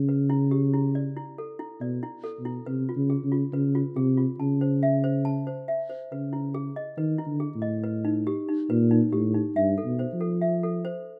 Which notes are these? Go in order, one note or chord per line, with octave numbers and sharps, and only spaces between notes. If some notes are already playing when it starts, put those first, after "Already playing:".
Already playing: C#3
B4
E4
G4
E4
D5
E4
A4
E4
B2 D5
E4
A4
B2
E4
C3 B4
F4
C#3
G#4
C#3
F4
C#3 B4
F4
C3 G#4
F4
C#3 A5
C5
E5
C5
A5
C5
E5
C5
C#3 B4
E4
G#4
D#5
D#3 B4
E4
D3
G#4
A2
D#5
B4
D#4
G4
D#4
A#2 B4
D#4
A2 G4
D#4
G2 E5
A4
B2
C5
F3
A4
E5
A4
C5